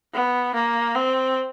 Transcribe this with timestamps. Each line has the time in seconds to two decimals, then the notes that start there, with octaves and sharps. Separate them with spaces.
0.14 B3
0.54 A#3
0.95 C4